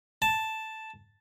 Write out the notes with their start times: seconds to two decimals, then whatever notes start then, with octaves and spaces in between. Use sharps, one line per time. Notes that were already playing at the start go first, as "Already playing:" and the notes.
0.22 A5